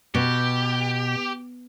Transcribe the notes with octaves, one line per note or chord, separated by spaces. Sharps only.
B2 G4